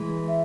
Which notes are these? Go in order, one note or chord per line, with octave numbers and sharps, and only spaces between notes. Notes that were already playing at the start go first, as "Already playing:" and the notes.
Already playing: E3 G#3
E5